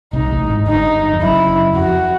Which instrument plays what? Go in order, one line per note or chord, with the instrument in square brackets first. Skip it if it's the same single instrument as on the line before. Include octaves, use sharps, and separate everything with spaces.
[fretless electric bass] C2 C3 [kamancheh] D#4
[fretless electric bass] A1 A2
G#1 G#2
[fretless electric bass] G1 G2 [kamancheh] D#4
[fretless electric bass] F2
[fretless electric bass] F#1 F#2 [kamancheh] E4
[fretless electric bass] F2 [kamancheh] F#4